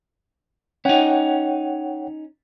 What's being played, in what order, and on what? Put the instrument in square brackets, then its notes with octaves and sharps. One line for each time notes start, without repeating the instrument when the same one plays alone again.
[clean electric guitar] C#4 D#4 [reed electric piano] C#5 F#5 G5